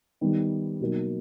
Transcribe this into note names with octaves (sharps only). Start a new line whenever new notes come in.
D#3 G3 B3 D#4
B2 F#3 A#3 D#4